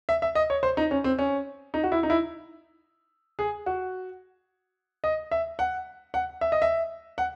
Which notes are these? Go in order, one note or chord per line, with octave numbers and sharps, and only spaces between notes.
E5
E5
D#5
C#5
C5
D#4
C#4
C4
C#4
D#4
F#4
E4
D#4
E4
G#4
F#4
D#5
E5
F#5
F#5
E5
D#5
E5
F#5